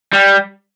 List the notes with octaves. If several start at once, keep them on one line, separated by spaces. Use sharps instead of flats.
G3